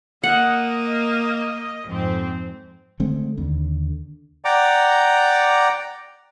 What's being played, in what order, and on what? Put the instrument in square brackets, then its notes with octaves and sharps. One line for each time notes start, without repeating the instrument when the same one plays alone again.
[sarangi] A#3 [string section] D#5 [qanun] F#5
[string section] F2 G#2 C4
[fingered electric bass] D3 G#3 A3 C4
D#2 D3
[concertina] D5 F#5 G5 A#5 D6